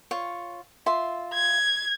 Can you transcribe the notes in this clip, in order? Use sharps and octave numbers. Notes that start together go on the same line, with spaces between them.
F4 C#5
F4 E5 C6
G#6